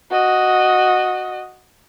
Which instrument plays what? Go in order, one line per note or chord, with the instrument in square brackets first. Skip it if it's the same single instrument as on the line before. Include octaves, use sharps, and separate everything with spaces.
[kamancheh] F#4 D#5